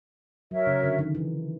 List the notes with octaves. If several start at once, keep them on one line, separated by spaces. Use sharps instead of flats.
F#3 F#4 A#4 C#5 E5
C#3
D3
D#3
E3